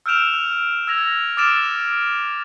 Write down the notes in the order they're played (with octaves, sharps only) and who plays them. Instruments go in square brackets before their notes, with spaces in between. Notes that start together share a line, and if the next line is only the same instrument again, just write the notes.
[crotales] E6 F6 G6 D7 E7 F7
E6 G#6 A#6 F7
D6 E6 F6 A6 D7 E7